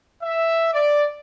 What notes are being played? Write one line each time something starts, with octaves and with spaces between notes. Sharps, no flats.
E5
D5